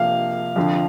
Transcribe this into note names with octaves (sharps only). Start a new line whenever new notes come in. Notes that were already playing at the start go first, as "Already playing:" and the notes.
Already playing: C3 F3 A#3 F5
F2 D3 F3